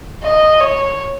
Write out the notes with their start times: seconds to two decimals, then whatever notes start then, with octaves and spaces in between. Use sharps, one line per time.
0.23 D#5
0.61 C#5